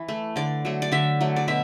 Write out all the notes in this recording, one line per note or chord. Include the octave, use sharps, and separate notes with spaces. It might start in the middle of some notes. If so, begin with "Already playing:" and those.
Already playing: E3
A3
D3 D5
F#3 A3
D5
D3 E5
F#3 A3
D5
B2 E5